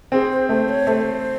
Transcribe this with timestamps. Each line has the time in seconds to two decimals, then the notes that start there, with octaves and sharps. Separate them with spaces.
0.12 C4 G#4
0.30 C5
0.49 A3 C5
0.69 C#5
0.87 A3 C5